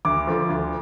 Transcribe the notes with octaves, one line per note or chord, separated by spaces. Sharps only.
D2 D6
D3 F3
D2